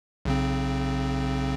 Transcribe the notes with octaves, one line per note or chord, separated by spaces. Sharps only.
B1 C#3 C4